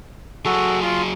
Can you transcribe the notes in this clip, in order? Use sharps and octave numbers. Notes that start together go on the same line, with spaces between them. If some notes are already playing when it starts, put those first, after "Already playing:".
F#3 F#4 G#4 A4
F4 C6